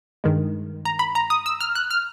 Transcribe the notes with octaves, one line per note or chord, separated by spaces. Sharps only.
G2 D#3 G#3
A#5
B5
A#5
D#6
E6
F6
F#6
F6